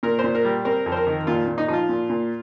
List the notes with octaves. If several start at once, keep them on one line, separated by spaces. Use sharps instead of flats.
A#2 A#4
C5
A#2
A#4
G3
C4 A#4
F2
C5
A#4
D#3
A#2 F4
A#2
D#4
F3 D#4 F4
A#2
A#2